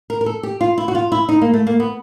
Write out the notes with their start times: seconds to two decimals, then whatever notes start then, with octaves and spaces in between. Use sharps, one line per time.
0.10 A#4
0.21 A#4
0.26 A4
0.43 G4
0.61 F4
0.78 E4
0.88 F#4
0.95 F4
1.12 E4
1.29 D#4
1.42 A#3
1.54 A3
1.67 A#3
1.80 B3